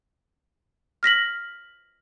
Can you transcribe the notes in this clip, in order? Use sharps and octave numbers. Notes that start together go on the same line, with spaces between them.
F6 A#6 B6 F#7